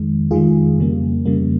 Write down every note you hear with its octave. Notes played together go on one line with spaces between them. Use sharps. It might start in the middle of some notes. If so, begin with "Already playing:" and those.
Already playing: F2 D#3 G#3
F2 D#3 G#3 F4 G#4
F2 C#3 G3 A#3
F2 C#3 G3 A#3